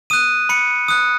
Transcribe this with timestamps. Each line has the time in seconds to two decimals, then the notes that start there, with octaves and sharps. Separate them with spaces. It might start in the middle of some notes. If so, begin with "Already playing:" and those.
0.10 D#6 F#6 D#7
0.49 B5 C#7
0.88 D#6 F#6